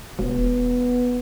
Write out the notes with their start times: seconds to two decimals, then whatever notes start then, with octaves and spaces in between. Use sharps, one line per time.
0.19 E1 B3